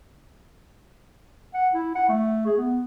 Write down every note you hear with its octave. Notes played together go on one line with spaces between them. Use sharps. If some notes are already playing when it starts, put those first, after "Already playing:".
F#5
E4
F#5
A3
G#4
B3